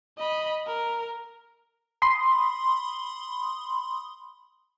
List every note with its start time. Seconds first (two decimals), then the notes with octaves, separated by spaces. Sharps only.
0.18 D#5 B5
0.67 A#4
2.02 B5 C6 D#6